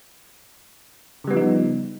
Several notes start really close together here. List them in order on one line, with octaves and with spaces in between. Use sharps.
C#3 G3 B3 F3 D#4